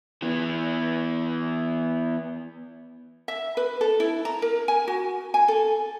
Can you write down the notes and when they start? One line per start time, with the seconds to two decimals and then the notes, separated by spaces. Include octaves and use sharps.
0.22 E3 B3
3.28 E5
3.57 B4
3.81 A4
4.00 E4
4.25 A#5
4.42 A#4
4.68 G#5
4.88 F#4
5.34 G#5
5.48 A4